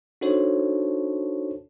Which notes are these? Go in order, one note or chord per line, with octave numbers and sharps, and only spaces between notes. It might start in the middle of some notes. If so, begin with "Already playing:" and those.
D4 D#4 F#4 A4 C5 C#5